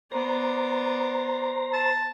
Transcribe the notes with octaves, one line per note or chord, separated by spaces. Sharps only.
B3 C5 D5 A#5
A5